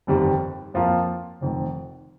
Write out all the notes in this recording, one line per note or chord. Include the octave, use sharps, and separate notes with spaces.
G1 F2 D#3 G3
F2 F3 A#3 F4
F1 F2 D#3